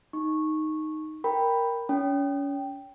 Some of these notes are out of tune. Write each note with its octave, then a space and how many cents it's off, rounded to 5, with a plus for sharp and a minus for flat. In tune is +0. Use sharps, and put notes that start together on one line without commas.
D#4 +0 C#6 -10
A#4 +0 G5 +5 B5 +0
C#4 +30 G5 +0